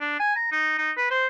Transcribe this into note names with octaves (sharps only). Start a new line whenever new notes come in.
D4
G#5
A#5
D#4
D#4
B4
C5